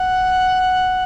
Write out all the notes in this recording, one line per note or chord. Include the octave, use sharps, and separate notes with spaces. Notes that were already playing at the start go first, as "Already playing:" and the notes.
Already playing: F#5